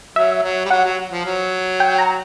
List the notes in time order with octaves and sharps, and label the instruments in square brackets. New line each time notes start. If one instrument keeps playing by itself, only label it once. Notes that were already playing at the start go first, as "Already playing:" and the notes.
[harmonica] F#3 [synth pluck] E5
[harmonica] F#3
G3
[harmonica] F#3 [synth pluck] F#5
[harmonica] F#3
F3
F#3
[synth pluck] G5
A#5